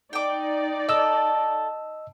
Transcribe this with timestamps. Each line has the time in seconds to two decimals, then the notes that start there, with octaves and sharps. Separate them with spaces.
0.13 D#4 D5 G5 D6
0.89 A4 D#5 E6